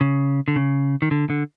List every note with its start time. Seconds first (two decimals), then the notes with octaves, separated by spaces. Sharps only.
0.01 C#3
0.48 D3
0.56 C#3
1.02 D#3
1.11 D3
1.30 D3